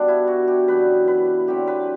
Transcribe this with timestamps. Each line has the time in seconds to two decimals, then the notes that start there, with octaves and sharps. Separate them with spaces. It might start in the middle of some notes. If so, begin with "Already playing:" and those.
Already playing: B2 G3 B3 D4
0.08 E4
0.27 F#4
0.48 G4
0.68 F#2 E3 G3 B3 B4
1.08 B4
1.47 D3 F#3 C4 G4
1.67 B4